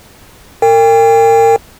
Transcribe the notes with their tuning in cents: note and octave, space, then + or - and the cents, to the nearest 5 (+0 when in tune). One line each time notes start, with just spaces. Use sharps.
A#4 -35 G5 +35